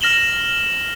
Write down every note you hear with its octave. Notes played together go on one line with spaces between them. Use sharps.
F6 A#6 E7 F#7 G7